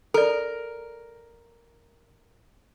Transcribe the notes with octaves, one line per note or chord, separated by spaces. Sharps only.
A4 A#4 D5